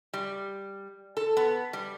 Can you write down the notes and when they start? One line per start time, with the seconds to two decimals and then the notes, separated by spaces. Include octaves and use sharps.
0.14 G3
1.17 A4
1.37 B3
1.73 G3